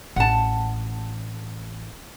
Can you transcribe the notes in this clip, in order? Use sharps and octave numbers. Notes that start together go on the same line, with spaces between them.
A1 F#5 A5